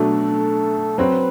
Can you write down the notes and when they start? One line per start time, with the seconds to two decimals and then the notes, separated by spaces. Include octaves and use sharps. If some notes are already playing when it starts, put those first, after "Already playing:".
Already playing: B2 F#3 A3 D4 A4
0.98 F#3 C4 F#4 B4